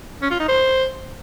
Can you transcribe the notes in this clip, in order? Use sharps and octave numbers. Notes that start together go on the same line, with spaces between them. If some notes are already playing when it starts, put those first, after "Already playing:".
C#4
F4
D#4
C5